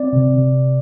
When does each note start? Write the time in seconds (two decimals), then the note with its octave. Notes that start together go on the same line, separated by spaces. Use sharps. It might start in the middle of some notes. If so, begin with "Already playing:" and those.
Already playing: C4 D5
0.13 C3
0.34 C3